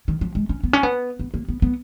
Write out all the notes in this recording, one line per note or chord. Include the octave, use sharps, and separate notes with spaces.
D#3
F3
G#3
C#4
B3
C#4
B3
B3
A#3
B3
B3